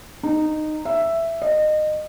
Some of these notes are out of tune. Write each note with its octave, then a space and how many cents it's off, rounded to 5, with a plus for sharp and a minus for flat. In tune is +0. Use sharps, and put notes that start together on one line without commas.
D#4 -15
E5 +5
D#5 -25